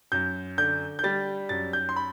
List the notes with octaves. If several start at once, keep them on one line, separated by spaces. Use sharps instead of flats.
F#2 G6
D3 G6
G6
G3 A6
F#2 A6
G6
C6
B5